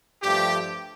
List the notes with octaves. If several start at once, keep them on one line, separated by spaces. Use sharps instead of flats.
G2 F3 A3 G4